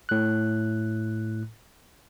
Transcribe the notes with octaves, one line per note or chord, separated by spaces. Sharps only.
A2 F#6